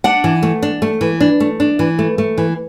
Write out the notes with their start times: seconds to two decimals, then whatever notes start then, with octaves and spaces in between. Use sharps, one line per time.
0.04 D4 F#5
0.24 E3
0.43 A3
0.63 D4
0.82 A3
1.01 E3
1.20 D4
1.40 A3
1.60 D4
1.79 E3
1.99 A3
2.18 A3
2.38 E3